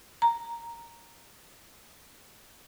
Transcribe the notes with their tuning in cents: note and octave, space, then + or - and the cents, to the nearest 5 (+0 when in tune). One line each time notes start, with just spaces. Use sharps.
A#5 -5